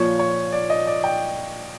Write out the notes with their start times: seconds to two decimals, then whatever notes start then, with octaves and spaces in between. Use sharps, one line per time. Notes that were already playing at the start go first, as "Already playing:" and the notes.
Already playing: A#2 F3 C#5
0.19 C#5
0.52 D5
0.70 D#5
0.87 D5
1.04 G5